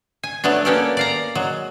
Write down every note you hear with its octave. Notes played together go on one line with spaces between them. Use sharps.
G#5
F#3 A3 B3 D4
A#3 B3 C#4 G4 A4 D5
D5 F5 A#5
F#3 G#3